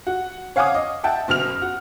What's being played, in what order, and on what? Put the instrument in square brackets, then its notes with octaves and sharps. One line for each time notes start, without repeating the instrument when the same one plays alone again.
[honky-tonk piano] F#4
C#5 F5 F#5 G#5 D6 D#6
D#5
E5 F#5 G5 A5
F#1 B2 F6 F7
F#4